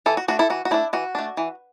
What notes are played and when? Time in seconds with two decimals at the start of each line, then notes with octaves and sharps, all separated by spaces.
0.06 E3 E4 A4
0.17 F#4
0.28 A3 D4 F#4
0.39 E4 A4
0.50 E3 F#4
0.65 F#4
0.71 A3 D4 E4
0.93 E3 F#4
1.15 A3 D4
1.37 E3